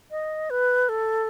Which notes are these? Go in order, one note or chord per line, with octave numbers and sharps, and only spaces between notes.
D#5
B4
A4